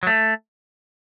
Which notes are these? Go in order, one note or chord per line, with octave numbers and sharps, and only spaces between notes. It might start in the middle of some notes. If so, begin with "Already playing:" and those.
F#3
A3